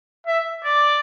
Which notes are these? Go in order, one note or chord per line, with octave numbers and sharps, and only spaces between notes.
E5
D5